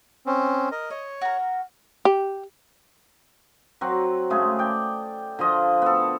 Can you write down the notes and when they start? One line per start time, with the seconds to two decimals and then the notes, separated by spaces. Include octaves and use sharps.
0.26 C4 C#4
0.72 A#4 D#5
0.90 C#5 D#5
1.21 F#4 A#4
2.05 G4
3.81 F#3 C4 F#4
4.30 C#3 G#3 A3 G#4
4.59 D5 G5
5.39 D3 F3 F4 D#5
5.82 B3 A4